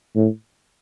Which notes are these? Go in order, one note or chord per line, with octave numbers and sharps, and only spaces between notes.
A2